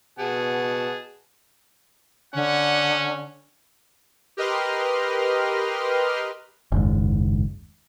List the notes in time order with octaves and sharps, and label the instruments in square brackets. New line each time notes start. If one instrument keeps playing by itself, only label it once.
[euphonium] B2 [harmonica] G#4 F#5 A5
[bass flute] D3 [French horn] C#4 [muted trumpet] F#5
[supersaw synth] G4 A#4 B4 D#5 C6 F6
[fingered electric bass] F#1 D#2 G#2